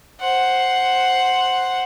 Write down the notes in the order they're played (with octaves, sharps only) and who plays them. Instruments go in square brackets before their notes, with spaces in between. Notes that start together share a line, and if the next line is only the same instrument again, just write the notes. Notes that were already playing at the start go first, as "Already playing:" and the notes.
[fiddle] C5 F#5